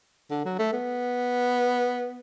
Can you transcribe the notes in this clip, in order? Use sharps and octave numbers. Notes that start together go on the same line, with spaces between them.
D3
F#3
A3
B3